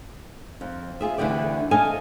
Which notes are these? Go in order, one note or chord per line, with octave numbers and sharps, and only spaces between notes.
F2
F4 G#4 E5
D2 D3 E3 A#3 G4 D5
A4 D#5 F5 G#5